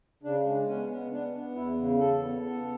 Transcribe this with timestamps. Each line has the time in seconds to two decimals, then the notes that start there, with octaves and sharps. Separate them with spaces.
0.23 C#3 D4
0.45 G#3
0.67 B3 C#4
0.89 B3
1.11 B3 D4
1.32 B3
1.55 E2 E4
1.77 C#3
1.98 E2 A4
2.21 B3
2.43 B3